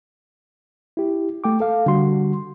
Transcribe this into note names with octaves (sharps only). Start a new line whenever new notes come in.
E4 G4
A3 G5 D6
A4 F5
D3 G3 F#4 C6